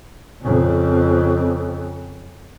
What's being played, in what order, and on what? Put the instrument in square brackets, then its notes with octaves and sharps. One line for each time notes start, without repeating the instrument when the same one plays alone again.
[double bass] F2 C#3